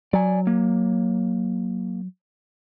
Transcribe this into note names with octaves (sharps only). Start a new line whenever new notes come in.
F#3 D5 G#5
A#3